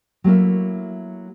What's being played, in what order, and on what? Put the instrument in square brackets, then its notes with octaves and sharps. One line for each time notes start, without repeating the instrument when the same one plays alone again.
[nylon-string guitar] F#3 A3 A#3 E4